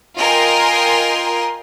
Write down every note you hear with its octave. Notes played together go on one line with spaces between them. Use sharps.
F4 A#4 D#5 G5 G#5 C6